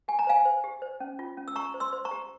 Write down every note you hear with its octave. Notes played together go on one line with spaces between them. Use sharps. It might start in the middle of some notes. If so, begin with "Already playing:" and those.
G4 G#5
A#5
C5 F5 G#5
C5
G4
C5
C#4
F4
C#4
E6
G4 A#5 C#6
C5
C6 E6
C5
A#5 C#6
G4